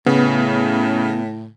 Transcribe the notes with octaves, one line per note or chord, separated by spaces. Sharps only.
A2 C#3 B3